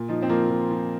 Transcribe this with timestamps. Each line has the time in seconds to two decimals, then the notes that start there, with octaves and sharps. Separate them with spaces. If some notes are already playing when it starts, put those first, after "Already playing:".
Already playing: A#2
0.08 F3 D#4
0.22 C4
0.29 F3 A#3
0.50 F3
0.71 F3